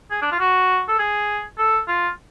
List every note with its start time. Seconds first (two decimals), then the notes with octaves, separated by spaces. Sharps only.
0.11 G#4
0.22 D4
0.32 F4
0.40 F#4
0.88 A4
0.99 G#4
1.58 A4
1.88 F4